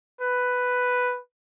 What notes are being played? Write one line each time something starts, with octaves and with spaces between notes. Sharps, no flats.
B4